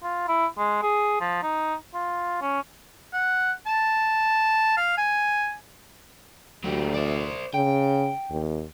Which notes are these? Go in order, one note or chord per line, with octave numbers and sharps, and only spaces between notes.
F4
E4
G#3
G#4
F3
D#4
F4
C#4
F#5
A5
F5
G#5
D2 F#3 G4
C5 D5
C#3 G5
D#2